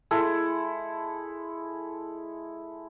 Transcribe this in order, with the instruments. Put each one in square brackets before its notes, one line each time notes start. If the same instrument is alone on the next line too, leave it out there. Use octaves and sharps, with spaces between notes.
[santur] G#3 E4 A4